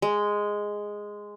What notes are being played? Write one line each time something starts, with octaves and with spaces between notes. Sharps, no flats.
G#3